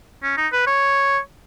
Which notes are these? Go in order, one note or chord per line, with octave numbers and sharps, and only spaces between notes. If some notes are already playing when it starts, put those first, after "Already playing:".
C#4
D#4
B4
C#5